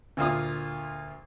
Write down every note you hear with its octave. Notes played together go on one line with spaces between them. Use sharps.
D2 A#2 F4 D#6